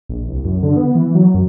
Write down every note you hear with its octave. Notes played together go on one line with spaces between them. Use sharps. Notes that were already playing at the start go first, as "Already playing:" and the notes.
A#1
C2
F#2
D3
B3
E3
F#3
F#2